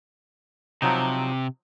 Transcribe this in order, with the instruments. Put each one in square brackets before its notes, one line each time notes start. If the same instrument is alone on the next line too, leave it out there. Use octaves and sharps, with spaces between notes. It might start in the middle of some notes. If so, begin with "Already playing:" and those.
[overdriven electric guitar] C3 [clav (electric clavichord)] F3 F#3 D#4